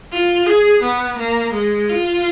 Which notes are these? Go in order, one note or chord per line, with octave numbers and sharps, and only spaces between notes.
F4
G#4
B3
A#3
G#3
F4